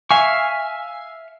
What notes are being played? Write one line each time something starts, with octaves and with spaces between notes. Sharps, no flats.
E5 F5 G#5 C#6